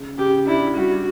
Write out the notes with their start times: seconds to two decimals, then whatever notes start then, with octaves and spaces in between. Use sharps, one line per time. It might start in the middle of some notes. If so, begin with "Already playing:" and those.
Already playing: C#3
0.18 C#3 G4
0.47 D4 E4
0.76 G3 F#4